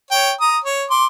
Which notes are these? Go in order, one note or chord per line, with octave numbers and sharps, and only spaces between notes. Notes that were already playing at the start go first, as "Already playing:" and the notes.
C#5 G5
A#5 D#6
C#5
C6 D6